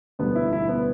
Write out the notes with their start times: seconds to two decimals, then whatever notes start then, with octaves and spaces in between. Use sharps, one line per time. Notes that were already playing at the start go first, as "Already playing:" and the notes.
0.19 E1 D2 D3 G3 B3
0.35 E4
0.53 E4
0.68 B3